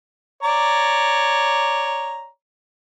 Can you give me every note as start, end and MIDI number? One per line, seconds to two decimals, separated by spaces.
0.43 2.27 73
0.43 2.27 74
0.43 2.27 82